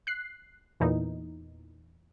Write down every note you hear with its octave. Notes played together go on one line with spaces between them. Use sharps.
F#6 C7
E2 A#2 E3 D#4